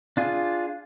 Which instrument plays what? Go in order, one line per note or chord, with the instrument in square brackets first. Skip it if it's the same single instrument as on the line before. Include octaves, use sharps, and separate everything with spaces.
[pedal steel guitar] D4 F4 G#4